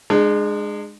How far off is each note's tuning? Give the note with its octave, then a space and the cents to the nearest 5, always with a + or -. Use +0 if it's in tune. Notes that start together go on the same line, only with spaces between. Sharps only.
G#3 +0 D4 +45